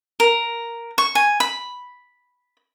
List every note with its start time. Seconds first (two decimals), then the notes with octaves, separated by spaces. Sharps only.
0.20 A#4
0.98 C#6
1.15 G#5
1.40 B5